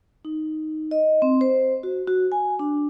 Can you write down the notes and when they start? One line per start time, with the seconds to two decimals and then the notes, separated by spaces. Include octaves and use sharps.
0.25 D#4
0.91 D#5
1.22 C4
1.41 C5
1.83 F#4
2.08 F#4
2.32 G#5
2.59 D4